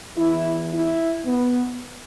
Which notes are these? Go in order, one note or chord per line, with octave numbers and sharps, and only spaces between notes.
E2 E3 E4
E4
B3